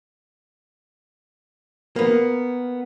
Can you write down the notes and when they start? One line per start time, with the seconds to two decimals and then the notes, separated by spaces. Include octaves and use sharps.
1.96 A#3 B3